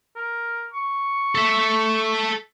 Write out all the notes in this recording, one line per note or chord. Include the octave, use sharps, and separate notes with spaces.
A#4
C#6
A4 E5